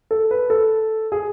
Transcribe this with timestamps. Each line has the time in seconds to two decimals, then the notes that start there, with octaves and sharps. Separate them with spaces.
0.11 A4
0.31 B4
0.50 A4
1.12 G#4